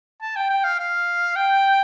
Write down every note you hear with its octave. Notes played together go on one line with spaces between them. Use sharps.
A5
G5
G5
F5
F5
G5